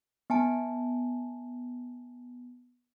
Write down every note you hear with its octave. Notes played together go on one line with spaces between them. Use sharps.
B3 G#5 A5